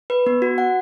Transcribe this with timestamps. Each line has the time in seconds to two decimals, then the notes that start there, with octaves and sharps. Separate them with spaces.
0.10 B4
0.26 B3
0.42 F#4
0.58 F#5